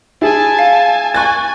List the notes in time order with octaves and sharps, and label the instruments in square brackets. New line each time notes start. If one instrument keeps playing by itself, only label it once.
[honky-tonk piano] E4 G#4 [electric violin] G#5 A5
[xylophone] F5
[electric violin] G#5 [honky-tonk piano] C#6 F#6 A6